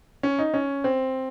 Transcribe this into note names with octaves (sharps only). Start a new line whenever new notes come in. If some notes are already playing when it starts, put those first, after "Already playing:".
C#4
D#4
C#4
C4